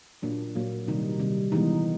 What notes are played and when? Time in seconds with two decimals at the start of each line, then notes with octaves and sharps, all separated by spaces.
0.22 A#2 F#3 A#3 D4
0.55 A#2 F#3 A#3
0.87 C3 D#3 G3 D#4
1.20 C3 D#3 G3
1.52 E3 G#3 B3 D#4